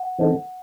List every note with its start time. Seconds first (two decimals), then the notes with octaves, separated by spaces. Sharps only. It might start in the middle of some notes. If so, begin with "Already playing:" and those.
Already playing: F#5
0.19 E3 C4 D#4 A4